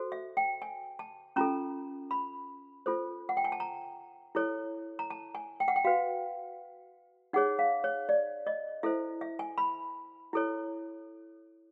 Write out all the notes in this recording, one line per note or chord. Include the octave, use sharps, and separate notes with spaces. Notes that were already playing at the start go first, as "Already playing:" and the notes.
Already playing: F#4 A4 C5
E5
G5
G#5
A5
C#4 F4 A4 A#5
B5
F4 A4 C5
F#5
G5
G#5
A5
A#5
E4 A4 C#5
A#5
A5
G#5
G5
F#5
G5
F#4 B4 F5
D#4 G#4 C#5 F#5
F5
C#5
D5
D#5
E4 A4 C5 E5
E5
G#5
B5
E4 A4 C#5